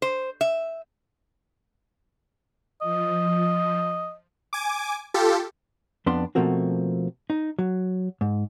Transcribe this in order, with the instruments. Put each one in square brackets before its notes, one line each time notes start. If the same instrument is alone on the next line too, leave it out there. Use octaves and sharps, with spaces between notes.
[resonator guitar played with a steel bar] C5
E5
[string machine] F3 [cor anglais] D#5
[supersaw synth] G#5 D6
F4 G4 A4
[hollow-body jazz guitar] F2 B3 D4 C6
B2 F3 A3 A#3 C4 F#4
D#4
F#3
G#2